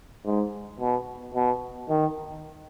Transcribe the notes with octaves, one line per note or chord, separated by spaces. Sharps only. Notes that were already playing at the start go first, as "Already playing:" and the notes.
G#2
B2
B2
D#3